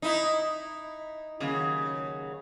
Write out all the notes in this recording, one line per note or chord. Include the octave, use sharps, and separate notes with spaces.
D#4 E4
D#2 C#3 F#3